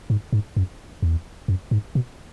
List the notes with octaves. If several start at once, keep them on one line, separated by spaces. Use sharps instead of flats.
G#2
G#2
F#2
E2
F#2
G#2
B2